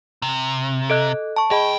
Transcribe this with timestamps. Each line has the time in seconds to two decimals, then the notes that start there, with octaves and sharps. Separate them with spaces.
0.22 C3
0.90 A4 D#5 F#6
1.36 A5 C#6
1.51 E2 G#4 D#5 G5 B5